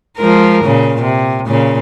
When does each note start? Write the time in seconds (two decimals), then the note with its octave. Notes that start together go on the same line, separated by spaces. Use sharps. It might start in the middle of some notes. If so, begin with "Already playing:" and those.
0.17 F3 G#3 A#4
0.64 A#2 C#3
1.02 C3
1.47 A#2 C#3